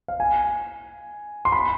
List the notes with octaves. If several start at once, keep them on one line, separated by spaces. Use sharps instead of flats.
F5
G#5
C6
B5